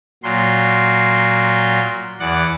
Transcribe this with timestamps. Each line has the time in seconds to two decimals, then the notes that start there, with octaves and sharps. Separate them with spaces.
0.23 A#2 F#3 C6
2.20 E2 D5 F#5